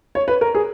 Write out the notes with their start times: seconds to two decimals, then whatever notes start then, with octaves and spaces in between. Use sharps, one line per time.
0.15 C#5
0.28 B4
0.41 A#4
0.55 G#4